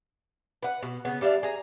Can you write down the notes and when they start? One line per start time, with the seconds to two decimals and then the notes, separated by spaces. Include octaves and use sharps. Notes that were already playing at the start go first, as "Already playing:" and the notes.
0.63 B4 F#5
0.83 B2
1.05 C#3 B3
1.21 G3 D4 E5 F5
1.43 G#4 A#5